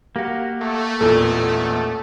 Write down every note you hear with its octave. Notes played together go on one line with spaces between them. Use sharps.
A#3 F#4 G4 F5
A3
A1 E2 A#2 A4